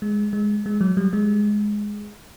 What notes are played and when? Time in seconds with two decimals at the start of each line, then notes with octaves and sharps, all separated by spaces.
0.02 G#3
0.33 G#3
0.66 G#3
0.81 F#3
0.97 G3
1.13 G#3